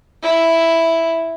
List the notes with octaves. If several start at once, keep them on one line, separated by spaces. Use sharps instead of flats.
E4